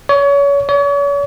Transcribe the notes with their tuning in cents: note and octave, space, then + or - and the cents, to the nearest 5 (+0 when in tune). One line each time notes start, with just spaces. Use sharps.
C#5 +30
C#5 +40